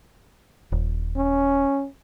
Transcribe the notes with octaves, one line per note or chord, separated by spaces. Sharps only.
D#1
C#4